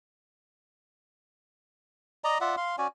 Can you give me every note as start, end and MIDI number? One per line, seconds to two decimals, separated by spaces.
2.24 2.38 74
2.24 2.38 75
2.24 2.38 82
2.41 2.56 65
2.41 2.56 74
2.41 2.56 76
2.41 2.56 78
2.57 2.76 77
2.57 2.76 84
2.78 2.87 61
2.78 2.87 66
2.78 2.87 74
2.78 2.87 80